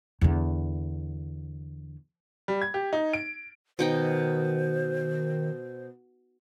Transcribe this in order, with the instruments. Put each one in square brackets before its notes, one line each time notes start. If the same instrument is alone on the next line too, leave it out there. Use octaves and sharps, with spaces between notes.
[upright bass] E2 D3
[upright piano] G3
G#6
G4
D#4
D7
[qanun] B2 D#4 G5 [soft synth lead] D#3 [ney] C5